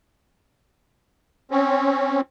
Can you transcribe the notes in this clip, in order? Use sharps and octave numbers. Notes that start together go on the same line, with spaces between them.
C4 C#4